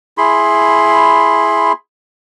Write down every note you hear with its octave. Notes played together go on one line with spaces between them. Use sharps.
E4 G#4 B5 C6